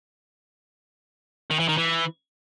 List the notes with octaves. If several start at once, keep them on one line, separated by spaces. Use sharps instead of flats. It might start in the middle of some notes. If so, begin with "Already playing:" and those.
D#3
E3
D#3
E3